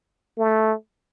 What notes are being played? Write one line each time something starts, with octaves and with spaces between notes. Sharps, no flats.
A3